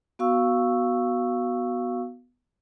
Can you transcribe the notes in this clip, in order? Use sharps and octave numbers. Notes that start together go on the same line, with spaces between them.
B3 F#4 F5 C#6 E6